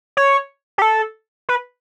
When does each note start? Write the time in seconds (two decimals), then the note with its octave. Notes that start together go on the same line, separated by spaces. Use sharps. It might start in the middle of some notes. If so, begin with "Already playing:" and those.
0.17 C#5
0.78 G4
0.82 A4
1.49 B4